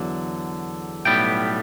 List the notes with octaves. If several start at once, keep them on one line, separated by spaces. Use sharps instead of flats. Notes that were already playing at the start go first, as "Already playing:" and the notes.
Already playing: E2 D3 F#3
B1 A2 G3 B3 G5